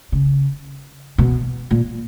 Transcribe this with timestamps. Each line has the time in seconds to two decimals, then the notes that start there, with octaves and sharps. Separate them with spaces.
0.12 C#3
1.18 B2
1.71 A#2